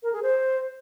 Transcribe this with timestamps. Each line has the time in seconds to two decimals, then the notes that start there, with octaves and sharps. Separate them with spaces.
0.03 A#4
0.13 G#4
0.23 C5